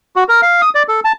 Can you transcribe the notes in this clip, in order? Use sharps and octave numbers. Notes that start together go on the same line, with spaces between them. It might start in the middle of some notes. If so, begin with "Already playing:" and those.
F#4
A#4
F5
D#6
D5
A4
A5